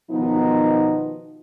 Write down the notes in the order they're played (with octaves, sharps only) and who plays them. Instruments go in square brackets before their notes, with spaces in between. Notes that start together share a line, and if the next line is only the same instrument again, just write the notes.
[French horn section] B2 D#3 F3 B3 D#4